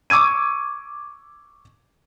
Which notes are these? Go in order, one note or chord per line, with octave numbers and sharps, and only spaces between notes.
C#6 D6 E6 G#6 D#7